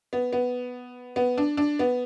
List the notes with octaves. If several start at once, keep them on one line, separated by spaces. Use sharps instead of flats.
B3
B3
B3
D4
D4
B3